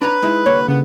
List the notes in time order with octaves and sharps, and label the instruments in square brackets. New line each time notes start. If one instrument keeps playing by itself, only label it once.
[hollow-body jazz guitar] D4 C#5 A#5 [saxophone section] B4
[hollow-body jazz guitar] G#3 D#4 E4
[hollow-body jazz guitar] C2 D3 A#3 [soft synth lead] C#5
[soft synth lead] C#3 [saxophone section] B3